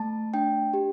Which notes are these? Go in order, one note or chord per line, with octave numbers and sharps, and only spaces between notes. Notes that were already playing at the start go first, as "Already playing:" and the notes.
Already playing: A3 A5
D4 G5
G4